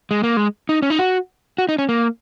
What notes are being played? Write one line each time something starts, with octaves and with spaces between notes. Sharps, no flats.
G#3
A#3
G#3
D#4
C#4
D#4
F#4
F#4
D#4
C#4
A#3